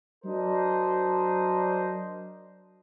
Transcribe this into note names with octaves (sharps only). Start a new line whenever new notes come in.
F#3 D4 A#4 C5 D#5